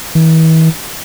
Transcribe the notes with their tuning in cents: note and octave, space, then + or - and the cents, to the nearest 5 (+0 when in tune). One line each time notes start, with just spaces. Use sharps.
E3 -40